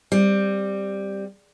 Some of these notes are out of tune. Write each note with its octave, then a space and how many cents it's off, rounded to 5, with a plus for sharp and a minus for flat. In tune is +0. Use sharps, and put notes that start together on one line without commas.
G3 +5 C4 +0